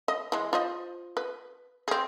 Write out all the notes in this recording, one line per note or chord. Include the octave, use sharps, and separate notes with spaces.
D#5
E3 G#3
F4 C5 D#5
B4
C4 G#4